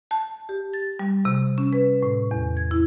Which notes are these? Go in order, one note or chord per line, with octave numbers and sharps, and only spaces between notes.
A5
G4
A6
G3
C3
C#4
B4
A2
E2
G#6
E4